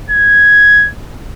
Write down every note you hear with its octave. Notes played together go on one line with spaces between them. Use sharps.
G#6